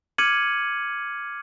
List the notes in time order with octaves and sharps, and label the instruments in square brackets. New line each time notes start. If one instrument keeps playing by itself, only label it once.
[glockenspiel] D6 F6 G#6 C#7 D#7 F#7